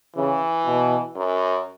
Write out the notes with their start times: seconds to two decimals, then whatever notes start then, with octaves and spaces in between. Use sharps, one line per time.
0.16 C#3 E3
0.66 B2
1.16 F#2